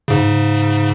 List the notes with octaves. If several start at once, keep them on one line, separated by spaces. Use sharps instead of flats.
G#2 C#3